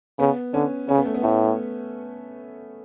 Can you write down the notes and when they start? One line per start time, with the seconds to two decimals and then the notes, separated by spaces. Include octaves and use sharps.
0.19 C#3 B3
0.54 D3 C#4
0.89 C#3 C#4
0.97 B3
1.05 A3
1.14 B3
1.22 A2 A3